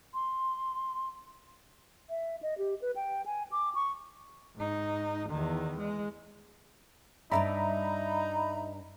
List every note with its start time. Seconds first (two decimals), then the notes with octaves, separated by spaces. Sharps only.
0.14 C6
2.10 E5
2.43 D#5
2.58 G4
2.82 B4
2.96 G5
3.26 G#5
3.52 D6
3.75 C#6
4.56 G#2 D#4
5.29 E2 D#3
5.79 G#3
7.31 G2 B2 D#4 D5 E5 A#5 B5